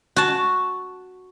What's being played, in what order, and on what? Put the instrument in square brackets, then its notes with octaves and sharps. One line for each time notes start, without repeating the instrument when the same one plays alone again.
[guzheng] F#4 A5